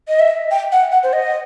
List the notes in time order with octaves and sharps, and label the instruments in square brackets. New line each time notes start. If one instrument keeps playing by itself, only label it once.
[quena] D#5
E5
G5
F#5
F#5
C5
D#5